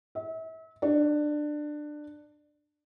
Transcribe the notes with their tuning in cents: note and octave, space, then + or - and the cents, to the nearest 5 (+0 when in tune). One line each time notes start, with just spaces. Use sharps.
E5 -35
D4 +20